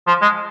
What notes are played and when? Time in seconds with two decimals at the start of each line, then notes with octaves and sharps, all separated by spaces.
0.07 F3
0.22 G#3